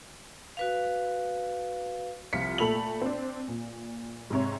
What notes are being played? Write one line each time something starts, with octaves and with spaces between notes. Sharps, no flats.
F#4 B4 F5
C2 F3 F4 B6 C#7
A#2 A3 A4 B5 F7 F#7
C4 D4
A#2
G#2 C3 C#5